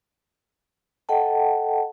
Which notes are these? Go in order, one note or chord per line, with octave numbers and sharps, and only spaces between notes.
A4 D#5 F#5 G5 A5